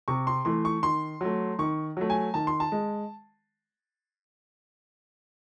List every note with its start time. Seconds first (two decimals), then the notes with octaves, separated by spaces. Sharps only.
0.08 C3 C#6
0.27 C6
0.45 E3 A3 C6
0.65 C#6
0.83 D#3 C6
1.21 F#3 A3
1.59 D#3 C#6
1.97 F#3 A3
2.10 G#5
2.34 D#3 A5
2.47 C6
2.60 A5
2.72 G#3